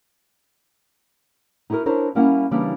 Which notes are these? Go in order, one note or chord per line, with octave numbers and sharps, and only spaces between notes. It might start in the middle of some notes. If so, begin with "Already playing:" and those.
D#4 E4 F#4 G#4 A#4
D4 E4 A#4 C5 C#5
G3 A#3 C#4 E4 A#4 F#5
C#3 E3 G3 A#3 D4